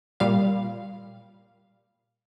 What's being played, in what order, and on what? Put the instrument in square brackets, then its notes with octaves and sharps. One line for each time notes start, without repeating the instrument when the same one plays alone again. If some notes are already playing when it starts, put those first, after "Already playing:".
[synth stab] A#2 G3 F5